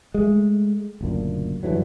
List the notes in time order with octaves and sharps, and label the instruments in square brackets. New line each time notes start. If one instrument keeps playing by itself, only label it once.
[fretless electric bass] G#3 A3
F#1 D2 A#2
G2 D3 E3 F#3